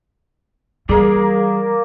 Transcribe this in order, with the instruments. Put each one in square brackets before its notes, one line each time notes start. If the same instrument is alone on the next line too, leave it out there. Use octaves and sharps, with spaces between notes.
[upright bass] E3 G3 [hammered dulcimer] A#3 A#4 D5 [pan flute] G#4